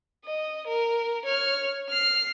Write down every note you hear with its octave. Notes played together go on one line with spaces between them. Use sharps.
D#5
A#4
C#5 F6
F6 C7